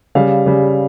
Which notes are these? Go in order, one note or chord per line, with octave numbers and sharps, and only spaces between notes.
C#3 G3 F5
C#3 G3